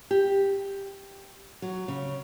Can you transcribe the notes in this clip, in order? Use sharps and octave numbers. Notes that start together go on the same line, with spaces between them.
G4
F#3
C#3